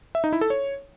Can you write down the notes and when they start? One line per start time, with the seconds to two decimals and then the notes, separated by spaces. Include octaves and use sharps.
0.15 E5
0.24 D#4
0.33 E4
0.41 A4
0.50 C#5